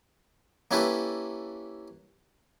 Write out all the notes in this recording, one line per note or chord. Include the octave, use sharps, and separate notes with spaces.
A#3 C#4 E4 G4 A4 B4